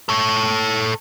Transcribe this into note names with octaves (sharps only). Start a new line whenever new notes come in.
A4 C#5